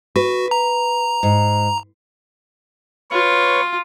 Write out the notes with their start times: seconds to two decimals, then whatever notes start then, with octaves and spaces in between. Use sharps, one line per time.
0.16 F#4 B4
0.51 A#5
1.23 G#2
3.11 F4 B4 C#5 C#6